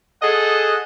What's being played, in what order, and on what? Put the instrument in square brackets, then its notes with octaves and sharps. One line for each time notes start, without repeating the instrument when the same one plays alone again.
[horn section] G#4 A4 D#5 F#5